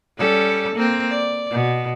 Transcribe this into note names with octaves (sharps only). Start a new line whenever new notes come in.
G3 C#4 A4
A#3 C4
D5
B2